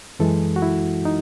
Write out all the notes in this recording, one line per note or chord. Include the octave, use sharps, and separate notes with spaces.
F#2 E3 G#3 A4
F#4
E4
D#4